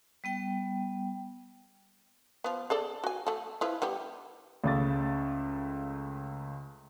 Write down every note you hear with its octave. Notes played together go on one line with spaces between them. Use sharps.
G3 B3 G5
F3 B3
G#4 A4 D5
F#4 G#5
A3 A4
F3 E4 B4
G3 B3 G4
C#2 C#3 A3 D6 A6